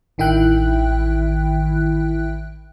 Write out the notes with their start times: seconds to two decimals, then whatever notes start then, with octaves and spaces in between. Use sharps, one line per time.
0.18 A1 D#3 E4 E5 G5 F#6